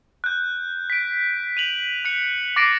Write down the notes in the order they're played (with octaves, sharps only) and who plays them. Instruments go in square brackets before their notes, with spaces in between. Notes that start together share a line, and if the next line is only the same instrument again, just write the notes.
[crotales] F#6 G6
B6 D7
D#7 F7 F#7
F#6 C#7
D6 A6 A#6 C7 D7 D#7